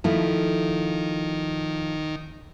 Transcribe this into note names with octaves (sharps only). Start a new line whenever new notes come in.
D#3 F3 A3 E4